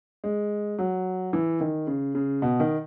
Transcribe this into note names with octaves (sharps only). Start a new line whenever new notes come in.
G#3
F#3
E3
D#3
C#3
C#3
B2
D#3